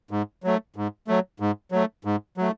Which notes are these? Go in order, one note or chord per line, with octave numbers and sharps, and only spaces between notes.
G#2
F#3 A3
G#2
F#3 A3
G#2
F#3 A3
G#2
F#3 A3